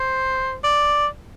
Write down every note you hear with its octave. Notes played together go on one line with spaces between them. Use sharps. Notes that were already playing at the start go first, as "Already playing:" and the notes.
Already playing: C5
D5